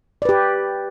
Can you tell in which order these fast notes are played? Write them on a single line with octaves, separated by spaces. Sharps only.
D5 B4 G4